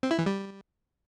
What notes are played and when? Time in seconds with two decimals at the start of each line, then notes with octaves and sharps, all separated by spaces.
0.03 C4
0.11 E4
0.19 E3
0.26 G3